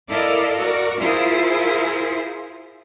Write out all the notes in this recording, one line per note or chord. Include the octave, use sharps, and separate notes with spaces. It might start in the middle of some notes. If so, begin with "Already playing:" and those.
E4 A4 A#4 D5 D#5 F5
F#4 A#4 D5
E4 F4 G#4 A#4 C5